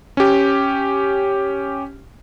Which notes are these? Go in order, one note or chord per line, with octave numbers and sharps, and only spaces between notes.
C#4 G4